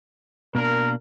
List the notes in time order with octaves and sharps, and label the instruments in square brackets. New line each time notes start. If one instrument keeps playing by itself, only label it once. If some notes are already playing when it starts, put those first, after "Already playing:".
[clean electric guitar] B2 A#3 D4 [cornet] A#4